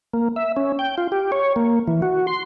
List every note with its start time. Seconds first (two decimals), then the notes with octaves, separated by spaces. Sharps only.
0.14 A#3
0.36 E5
0.56 C#4
0.79 G5
0.98 F4
1.12 G4
1.32 C#5
1.56 A#3
1.88 E3
2.02 F#4
2.27 C6